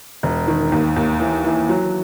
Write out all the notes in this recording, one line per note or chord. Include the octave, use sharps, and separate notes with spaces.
E1
D#3
D#2
D#2
E3
E3
F#3